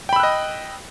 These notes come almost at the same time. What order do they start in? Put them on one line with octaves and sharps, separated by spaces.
G5 B5 E6 F#6 D#5